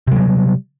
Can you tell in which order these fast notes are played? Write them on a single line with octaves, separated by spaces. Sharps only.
C3 G3 F#3